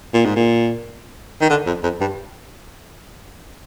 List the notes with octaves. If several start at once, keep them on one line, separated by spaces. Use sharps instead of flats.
A#2
G#2
A#2
D#3
D3
F2
F2
G2